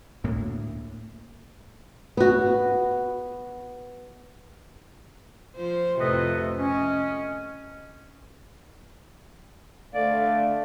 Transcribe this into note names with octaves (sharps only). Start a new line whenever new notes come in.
D2 A2 A#3
B3 F#4
F3 C5
F2 A2 C3 A4 B4 D#5
C#4 D#5
D3 A3 D5 F5